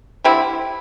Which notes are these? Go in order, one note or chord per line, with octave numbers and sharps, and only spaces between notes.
D3 G3 C4 E4